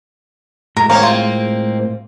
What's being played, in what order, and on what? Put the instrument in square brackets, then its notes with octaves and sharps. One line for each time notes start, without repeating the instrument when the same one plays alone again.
[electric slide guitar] A2 G#3 [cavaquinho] A#4
[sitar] A#3 C4 [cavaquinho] C#5 F5 A#5
[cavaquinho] F4